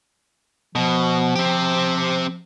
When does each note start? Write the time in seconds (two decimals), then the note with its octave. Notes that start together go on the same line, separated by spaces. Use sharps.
0.75 B2 F3
1.35 C4 G4